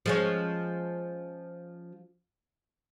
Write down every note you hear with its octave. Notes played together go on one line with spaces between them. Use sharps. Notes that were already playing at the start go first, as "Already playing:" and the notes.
F3 G#3 C#4